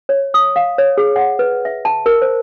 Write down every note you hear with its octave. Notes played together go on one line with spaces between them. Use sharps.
C#5
D#6
F5
C#5
G#4
F#5
B4
E5
A5
A#4
C5